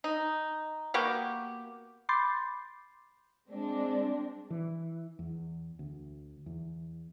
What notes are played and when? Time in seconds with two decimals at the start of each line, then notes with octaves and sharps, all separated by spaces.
0.04 D#4
0.94 A#3 B3 F#4 G4
2.09 B5 C6 D6 G6 A6 C7
3.49 G#3 C4 D4
4.50 E3
5.19 E2
5.79 D2
6.46 E2